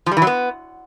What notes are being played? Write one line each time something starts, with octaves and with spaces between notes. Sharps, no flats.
F3
G3
E3
F#3
B3